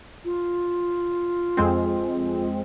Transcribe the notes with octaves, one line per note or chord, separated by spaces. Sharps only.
F4
F2 G#3 C4